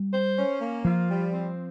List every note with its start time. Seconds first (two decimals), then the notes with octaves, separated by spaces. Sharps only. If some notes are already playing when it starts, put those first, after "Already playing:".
Already playing: G3
0.13 C5
0.37 C#4
0.61 A#3
0.85 F3 F4
1.10 G3
1.32 C4